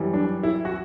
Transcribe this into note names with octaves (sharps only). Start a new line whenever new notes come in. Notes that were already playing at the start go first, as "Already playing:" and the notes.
Already playing: F#2 E3 G3
D4
E4
F#4